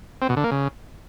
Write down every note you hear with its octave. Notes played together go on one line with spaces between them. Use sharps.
C4
B2
D3
A#3
C#3